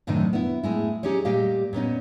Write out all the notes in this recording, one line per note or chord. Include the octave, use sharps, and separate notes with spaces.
F#2 A2 C3 D#3 D4 D#4
B3 E4
A2 G#3 E4
C#4 D#4 G4 G#4 C#5
A#2 G3 G4 D#5 F5
A#2 B3 C#4 D#4